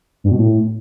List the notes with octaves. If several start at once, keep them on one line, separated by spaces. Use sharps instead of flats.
G2
B2
A2